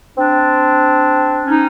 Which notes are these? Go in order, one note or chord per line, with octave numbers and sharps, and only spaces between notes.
C4 D4
C#4 D#4